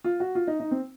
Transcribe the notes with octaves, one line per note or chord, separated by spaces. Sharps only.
F4
F#4
F4
D#4
D#4
C4